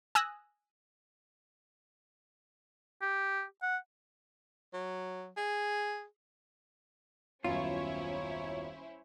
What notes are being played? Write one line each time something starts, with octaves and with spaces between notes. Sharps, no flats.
G#5 D#6 E6 F#6 A#6
G4
F#5
F#3
G#4
D#1 F#2 B3 C#4 E4 F4 C5 C#5